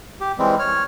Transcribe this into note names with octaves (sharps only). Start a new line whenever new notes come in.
G4
E3 G3 G#3 C4
C#5 F6